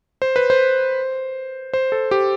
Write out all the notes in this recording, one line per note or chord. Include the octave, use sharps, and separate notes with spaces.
C5
B4
C5
C5
A4
G4